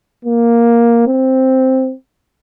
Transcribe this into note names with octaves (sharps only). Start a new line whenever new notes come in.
A#3
C4